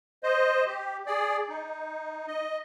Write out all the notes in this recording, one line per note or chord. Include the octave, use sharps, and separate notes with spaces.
C5 D#5
G4
G#4 D5
D#4
D#5